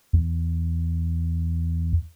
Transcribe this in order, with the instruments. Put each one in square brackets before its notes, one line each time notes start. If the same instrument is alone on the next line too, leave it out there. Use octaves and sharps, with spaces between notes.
[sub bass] E2